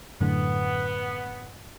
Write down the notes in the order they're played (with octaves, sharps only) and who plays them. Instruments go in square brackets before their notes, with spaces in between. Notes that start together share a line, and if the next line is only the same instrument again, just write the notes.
[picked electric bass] F#2 A2 D3 [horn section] B3